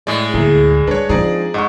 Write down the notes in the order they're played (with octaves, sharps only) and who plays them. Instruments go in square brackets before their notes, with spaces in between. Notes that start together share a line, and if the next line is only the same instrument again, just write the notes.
[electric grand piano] A2 D5 [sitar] G#3
[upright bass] D2 [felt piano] A#3 E4 G#4
[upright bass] G3 [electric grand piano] D4 C#5 [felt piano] B4
[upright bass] G2 D4 [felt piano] F3 C4 D#4 [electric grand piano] G#4 D5 A#5
[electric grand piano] G#2 [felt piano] D#5 F#5 C#6